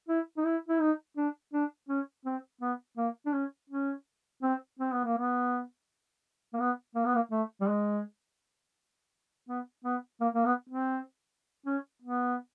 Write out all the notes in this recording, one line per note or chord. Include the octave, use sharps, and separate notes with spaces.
E4
D#4
E4
E4
D#4
D4
D4
C#4
C4
B3
A#3
D4
C#4
C#4
C4
C4
B3
A#3
B3
A#3
B3
A#3
B3
A#3
A3
G3
G#3
B3
B3
A#3
A#3
B3
C4
C#4
B3